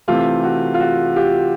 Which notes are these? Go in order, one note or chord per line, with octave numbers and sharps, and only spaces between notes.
C3 E3 A3 F4 G4
F#4
F4
F#4
F4 G4